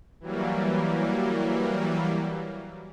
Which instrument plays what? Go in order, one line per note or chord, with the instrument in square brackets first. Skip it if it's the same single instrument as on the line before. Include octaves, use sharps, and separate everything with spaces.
[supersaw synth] E3 F#3 G3 A#3